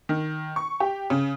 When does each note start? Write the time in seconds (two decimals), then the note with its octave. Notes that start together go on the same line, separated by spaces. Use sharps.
0.09 D#3
0.56 C#6
0.80 G4
1.10 C#3